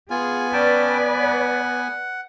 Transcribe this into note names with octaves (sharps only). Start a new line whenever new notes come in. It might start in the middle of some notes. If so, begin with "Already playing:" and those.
B3 F4 G#4 G#5
C#4 B4 D5 G5 A5
F#5